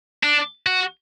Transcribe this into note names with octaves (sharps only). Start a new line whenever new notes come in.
D4
F#4